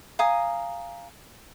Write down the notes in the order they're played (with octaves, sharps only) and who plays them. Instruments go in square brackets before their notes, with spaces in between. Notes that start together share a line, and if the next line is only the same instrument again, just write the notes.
[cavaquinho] F5 G#5 A#5 D#6